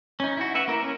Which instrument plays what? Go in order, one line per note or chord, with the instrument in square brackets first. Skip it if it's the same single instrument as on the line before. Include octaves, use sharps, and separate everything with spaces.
[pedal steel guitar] C#4 D#4
E4 F#4
E4 B4 E5 F#5
A#3 E4 A#4 E5
C#4